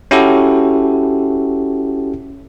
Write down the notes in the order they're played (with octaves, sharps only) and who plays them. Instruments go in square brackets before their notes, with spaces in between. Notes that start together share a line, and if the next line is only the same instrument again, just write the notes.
[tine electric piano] C#4 E4 F#4 G4 A4